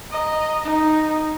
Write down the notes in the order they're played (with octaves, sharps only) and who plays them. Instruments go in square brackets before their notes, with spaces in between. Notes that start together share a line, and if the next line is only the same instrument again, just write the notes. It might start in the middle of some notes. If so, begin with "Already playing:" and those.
[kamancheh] D#5 A#5
D#4